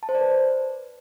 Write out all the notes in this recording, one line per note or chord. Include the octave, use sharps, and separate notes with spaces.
A5
C5
D5
B4